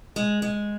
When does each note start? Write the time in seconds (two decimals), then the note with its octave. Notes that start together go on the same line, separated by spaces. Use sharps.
0.16 G#3
0.42 G#3